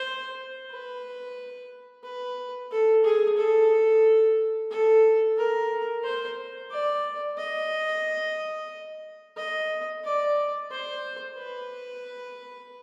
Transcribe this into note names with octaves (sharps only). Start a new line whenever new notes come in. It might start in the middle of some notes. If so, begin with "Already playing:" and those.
Already playing: C5
B4
B4
A4
G#4
A4
A4
A#4
C5
D5
D#5
D#5
D5
C5
B4